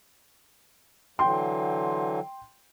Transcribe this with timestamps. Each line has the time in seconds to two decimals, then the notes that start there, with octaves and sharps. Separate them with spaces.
1.19 D3 E3 F#3 G5 C6